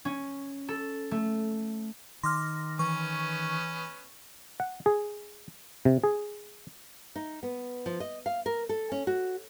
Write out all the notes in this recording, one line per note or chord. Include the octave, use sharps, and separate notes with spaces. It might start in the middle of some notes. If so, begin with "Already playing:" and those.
C#4
A4
A3
D#3 C6 D6 F6 A#6
E3 B3 C#4 C#6
F#5
G#4
C3
G#4
D#4
B3
F3
D#5
F5
A#4
A4
C#4
F#4